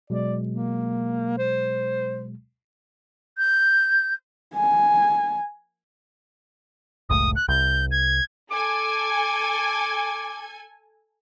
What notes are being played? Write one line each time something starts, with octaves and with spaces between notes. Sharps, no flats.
B2 F#3 G#3 D5
A#3
C5
G6
G#5
F#1 C#2 A2 D#6
F#6
C2 G6
G#6
A4 G#5 D6 G#6